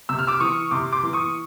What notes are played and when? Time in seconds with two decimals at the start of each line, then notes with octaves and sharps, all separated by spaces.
0.09 C3 E6
0.19 F6
0.27 D6 E6
0.40 E3 C#6 D#6
0.71 C3 C6 D6
0.93 C6 D6
1.03 E3
1.13 C#6 D#6